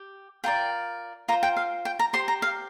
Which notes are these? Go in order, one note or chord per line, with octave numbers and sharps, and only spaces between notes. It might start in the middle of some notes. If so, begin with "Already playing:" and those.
Already playing: G4
F4 A#4 D5 G5
F4 C5 A#5
G5
F5
G5
A#5
G4 C5 C6
A#5
F5